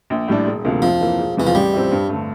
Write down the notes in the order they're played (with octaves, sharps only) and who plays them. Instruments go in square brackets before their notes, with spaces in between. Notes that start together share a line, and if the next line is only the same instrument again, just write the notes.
[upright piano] A#1
A2 G3 D4
E1
D2 C3 F3 A#3
[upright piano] F2 [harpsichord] F3
[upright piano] E3 A#3
E1
[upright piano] E2 C3 G3 [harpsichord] E3
[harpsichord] F3
[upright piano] A1 [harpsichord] G3
[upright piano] A2 F3 C4
G2
D3 A3